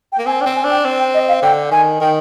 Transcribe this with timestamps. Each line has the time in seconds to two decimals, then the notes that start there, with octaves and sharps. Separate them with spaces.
0.12 G5
0.18 A#3
0.26 C4 G#5
0.41 D4 G5
0.46 C4
0.56 G#5
0.65 D4
0.70 G5
0.85 C4
0.99 G5
1.14 D#5
1.28 F5
1.42 D3 G5
1.71 D#3 G#5
2.00 D#3 G5